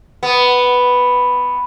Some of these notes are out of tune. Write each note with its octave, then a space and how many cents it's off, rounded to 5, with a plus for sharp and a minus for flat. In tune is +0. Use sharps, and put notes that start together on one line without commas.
B3 +0